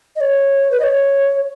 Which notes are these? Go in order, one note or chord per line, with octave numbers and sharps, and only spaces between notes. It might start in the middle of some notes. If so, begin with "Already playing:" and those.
D#5
C#5
B4
D#5
C#5